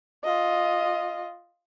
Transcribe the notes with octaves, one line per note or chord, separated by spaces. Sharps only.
F4 D#5